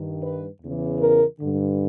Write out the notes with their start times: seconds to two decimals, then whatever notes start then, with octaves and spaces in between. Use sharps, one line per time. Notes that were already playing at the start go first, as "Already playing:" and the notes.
Already playing: G2 D#3
0.23 B4
0.61 E2 C#3 E3
1.00 A#4
1.38 G2 D3